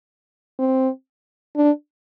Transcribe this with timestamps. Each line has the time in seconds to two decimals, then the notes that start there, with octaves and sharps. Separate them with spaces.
0.60 C4
1.56 D4